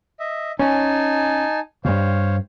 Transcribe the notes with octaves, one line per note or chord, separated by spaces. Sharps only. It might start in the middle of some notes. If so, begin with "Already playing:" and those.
D#5 E5
C#4 D#4 G#5 A5
D2 G2 C5 C#5 F5